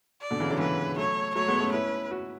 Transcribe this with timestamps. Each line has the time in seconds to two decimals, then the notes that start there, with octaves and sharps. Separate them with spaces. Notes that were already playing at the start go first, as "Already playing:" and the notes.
0.21 D5
0.31 B2 D3
0.40 C#3 E3
0.50 D3 F#3
0.59 E3 G#3 B4
0.97 F#3 A3 C#5
1.35 F#3 A3 C#5
1.48 G#3 B3
1.60 A3 C#4
1.73 C#4 E4 B4
2.11 F#4